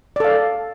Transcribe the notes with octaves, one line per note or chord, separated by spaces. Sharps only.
A4 D5 F5